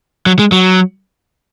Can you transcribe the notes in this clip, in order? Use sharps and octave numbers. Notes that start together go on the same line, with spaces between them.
F#3
G#3
F#3